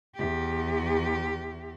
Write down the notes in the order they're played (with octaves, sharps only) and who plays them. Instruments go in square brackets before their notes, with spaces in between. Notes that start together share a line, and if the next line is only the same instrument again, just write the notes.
[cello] E2 G4